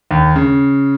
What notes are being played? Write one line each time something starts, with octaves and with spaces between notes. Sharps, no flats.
D#2
C#3